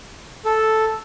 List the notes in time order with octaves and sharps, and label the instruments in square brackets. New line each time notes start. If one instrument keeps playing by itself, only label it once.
[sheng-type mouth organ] A4